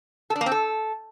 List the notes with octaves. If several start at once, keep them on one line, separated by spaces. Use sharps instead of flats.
A4
D4
A#3
C4
A4